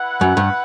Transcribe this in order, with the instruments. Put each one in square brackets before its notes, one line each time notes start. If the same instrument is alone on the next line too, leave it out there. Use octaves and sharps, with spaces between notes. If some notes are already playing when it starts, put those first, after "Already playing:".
Already playing: [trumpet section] E4 B4 F#5
[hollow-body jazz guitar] F#2
G2